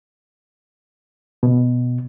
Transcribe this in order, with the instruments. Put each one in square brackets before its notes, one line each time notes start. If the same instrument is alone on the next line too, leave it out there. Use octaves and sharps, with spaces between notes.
[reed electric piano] B2